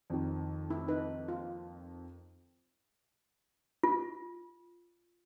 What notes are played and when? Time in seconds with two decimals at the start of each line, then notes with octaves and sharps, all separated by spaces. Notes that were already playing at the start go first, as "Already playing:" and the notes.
0.10 F2 D#3
0.70 E4
0.88 D#4 B4
1.28 F4
3.84 F4